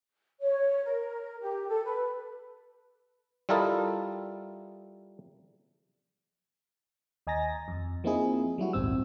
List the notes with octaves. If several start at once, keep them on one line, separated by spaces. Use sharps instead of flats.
C#5
A#4
G4
A4
B4
G3 E4 F4 A4 A#4 D#5
D#2 D#5 G#5 A#5 A6 A#6
F2
F3 A#3 C4 D#4 E4 G#4
F#3 G3 E4 F#4
A#1 D#2 G#2 C4 E6